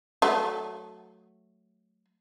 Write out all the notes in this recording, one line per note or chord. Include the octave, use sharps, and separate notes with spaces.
F#3 A3